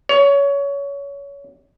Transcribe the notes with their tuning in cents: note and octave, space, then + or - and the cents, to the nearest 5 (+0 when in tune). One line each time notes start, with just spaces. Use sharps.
C#5 +20